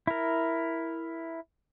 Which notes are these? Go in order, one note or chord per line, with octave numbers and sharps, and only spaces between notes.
E4 A#4